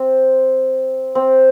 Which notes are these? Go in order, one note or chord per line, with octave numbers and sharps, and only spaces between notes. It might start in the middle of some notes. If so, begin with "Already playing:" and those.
Already playing: C4
C4